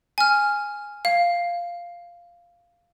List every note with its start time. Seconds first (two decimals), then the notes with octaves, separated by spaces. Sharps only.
0.18 G#5 F6
1.05 F5